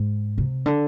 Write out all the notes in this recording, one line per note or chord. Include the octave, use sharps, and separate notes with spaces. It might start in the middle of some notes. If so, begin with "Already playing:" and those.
Already playing: G#2
C3
D3